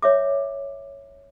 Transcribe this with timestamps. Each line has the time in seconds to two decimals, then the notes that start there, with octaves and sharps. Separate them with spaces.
0.02 C#5 E5 D6